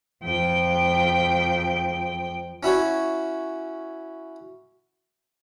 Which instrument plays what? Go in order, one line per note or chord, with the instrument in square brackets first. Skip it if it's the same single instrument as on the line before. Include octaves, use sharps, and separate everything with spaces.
[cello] F2 G5
[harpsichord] C#4 E4 F#4 C#5